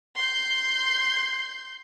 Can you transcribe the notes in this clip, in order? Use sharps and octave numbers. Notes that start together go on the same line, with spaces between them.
C6 G6